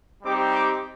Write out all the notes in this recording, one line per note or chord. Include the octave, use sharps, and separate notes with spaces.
G3 C4 D#4 G4 D6
D6